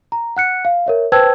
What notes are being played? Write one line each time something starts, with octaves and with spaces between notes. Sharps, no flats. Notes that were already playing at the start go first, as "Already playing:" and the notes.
A#5
F#5 F#6 C#7
F5
A#4 C#5 E5
B4 C5 G5 A5 E6 G#6